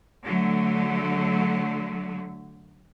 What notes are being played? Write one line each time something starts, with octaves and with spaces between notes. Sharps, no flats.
D3 F#3 A3